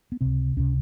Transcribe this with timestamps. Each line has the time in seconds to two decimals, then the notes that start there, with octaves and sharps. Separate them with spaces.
0.12 B3
0.21 C#2 C3 C4
0.56 C#2 C3 C#4